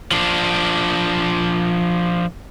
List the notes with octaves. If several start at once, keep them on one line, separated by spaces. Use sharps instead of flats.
F3 D4